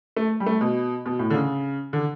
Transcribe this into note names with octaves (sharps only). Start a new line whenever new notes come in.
A3
G3
A3
B2
B2
A2
D3
C#3
D3